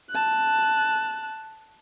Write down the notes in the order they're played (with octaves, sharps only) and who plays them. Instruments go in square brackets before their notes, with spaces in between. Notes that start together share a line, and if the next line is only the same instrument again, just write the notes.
[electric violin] A5 F#6